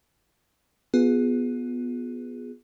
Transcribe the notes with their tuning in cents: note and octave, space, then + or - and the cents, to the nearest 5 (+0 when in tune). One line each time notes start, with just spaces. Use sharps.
B3 +0 F4 +25 G#4 +0